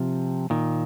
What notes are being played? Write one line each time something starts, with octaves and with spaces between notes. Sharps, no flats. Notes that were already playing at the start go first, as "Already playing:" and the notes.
Already playing: C3 F3
A#2 D#3